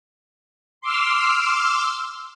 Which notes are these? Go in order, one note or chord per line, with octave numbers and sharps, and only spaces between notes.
C6 D6 E6 F6